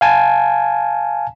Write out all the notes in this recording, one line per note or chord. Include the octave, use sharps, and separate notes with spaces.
F5 G#5 A5